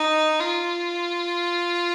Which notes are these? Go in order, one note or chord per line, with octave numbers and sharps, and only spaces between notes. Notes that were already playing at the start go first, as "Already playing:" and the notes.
Already playing: D#4
F4